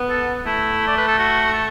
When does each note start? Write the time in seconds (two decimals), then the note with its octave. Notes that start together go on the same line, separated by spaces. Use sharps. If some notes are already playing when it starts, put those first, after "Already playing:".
Already playing: B3
0.10 A4
0.45 A3 E4
0.87 D5
0.98 B4
1.08 A4
1.18 F#4
1.53 A4